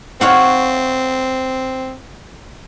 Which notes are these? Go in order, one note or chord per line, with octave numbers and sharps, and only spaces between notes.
C4 C#5 F5 F#5